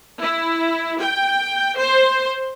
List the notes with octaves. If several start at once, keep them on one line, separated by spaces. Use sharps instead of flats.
E4
G5
C5